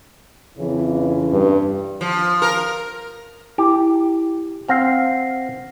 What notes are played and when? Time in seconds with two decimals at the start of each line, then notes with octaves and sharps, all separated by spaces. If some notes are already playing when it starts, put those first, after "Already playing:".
0.58 F2 C#3 E3
1.33 G2
2.01 F3
2.42 A#4
3.58 E4 G4
4.68 C4 F5 F#5 A#6 C7